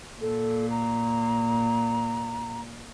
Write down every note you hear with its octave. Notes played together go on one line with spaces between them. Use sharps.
A#2 A4
A#5